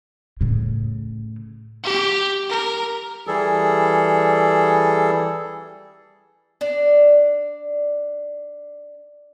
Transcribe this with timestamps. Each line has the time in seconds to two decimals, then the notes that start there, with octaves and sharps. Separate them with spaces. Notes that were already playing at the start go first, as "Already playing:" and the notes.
0.41 A2 C#3
1.84 G4
2.49 A#4
3.27 E3 G3 G#4 A4
6.61 D4 D5